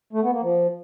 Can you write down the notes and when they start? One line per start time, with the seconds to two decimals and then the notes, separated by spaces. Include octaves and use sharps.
0.13 A3
0.22 B3
0.32 A#3
0.42 F3